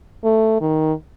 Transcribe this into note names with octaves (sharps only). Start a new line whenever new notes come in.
A3
D#3